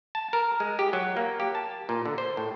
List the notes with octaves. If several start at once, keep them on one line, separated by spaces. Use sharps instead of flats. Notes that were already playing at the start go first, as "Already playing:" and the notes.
A5
A#4
G#3
G4
F#3
A#3
G4
A5
A#2
D3
C5
A2